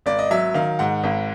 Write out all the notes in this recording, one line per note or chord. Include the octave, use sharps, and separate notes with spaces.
G#1 D5
D#5
F#3 E5
D#3 F5
G#2 F#5
G#1